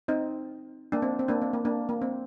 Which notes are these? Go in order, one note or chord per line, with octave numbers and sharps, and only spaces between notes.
C4 D#4
A#3 D4
C4
C4
A#3 D4
C4
A#3
A#3 D4
A#3
C4